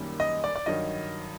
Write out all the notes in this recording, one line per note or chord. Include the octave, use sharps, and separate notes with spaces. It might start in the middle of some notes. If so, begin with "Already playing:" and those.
Already playing: F#2 D#3 G3 A#3
D#5
D5
D5
G2 D#3 F#3 D#5